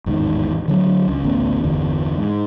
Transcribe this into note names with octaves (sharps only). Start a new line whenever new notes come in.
A1 E2 G#2 D#3
D3 F#3 D4
C#2
A1 D2 B3 C#4
G1 E2 D3
G#2